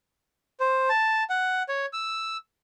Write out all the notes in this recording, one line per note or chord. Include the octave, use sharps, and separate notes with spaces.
C5
A5
F#5
C#5
E6